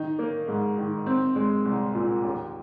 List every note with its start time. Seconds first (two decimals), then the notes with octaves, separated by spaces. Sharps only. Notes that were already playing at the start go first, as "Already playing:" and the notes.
Already playing: D#3 D#4
0.19 A#3
0.48 G#2
0.78 D#3
1.06 C4
1.36 G#3
1.65 C2
1.95 A#2
2.24 D#2